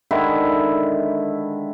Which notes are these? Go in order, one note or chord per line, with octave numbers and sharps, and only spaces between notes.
D3 D#3 G#3 E4